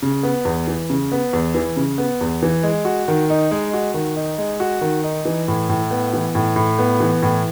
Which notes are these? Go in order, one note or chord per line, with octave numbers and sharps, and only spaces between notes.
C#3
B3
E2
E3
C#3
B3
E2
E3
C#3
B3
E2
E3
G#3
F#4
D#3
D#4
G#3
F#4
D#3
D#4
G#3
F#4
D#3
D#4
E3
A2
A2
B3
E3
A2
A2
B3
E3
A2